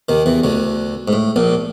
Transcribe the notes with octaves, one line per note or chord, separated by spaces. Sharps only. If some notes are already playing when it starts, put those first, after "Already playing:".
D#2 D#3
E2 E3
D2 D3
G#2
A2
A#1 A#2